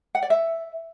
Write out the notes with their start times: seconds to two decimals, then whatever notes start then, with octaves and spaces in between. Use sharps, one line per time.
0.15 F#5
0.22 D5
0.30 E5